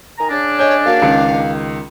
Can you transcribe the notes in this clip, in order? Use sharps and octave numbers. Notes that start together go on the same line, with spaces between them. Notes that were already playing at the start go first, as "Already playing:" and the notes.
D#3 G#5 A#5
C#3 C#4 D4
C#5 D#5 G#5 G6
A#3 F#4 F5
C#2 D#3